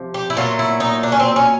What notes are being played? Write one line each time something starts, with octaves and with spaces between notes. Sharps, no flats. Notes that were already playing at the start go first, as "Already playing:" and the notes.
Already playing: C3 F3
G4
E4
A#2 F#3 A3 F4
E4
D#4
D4
C#4
C4
C#4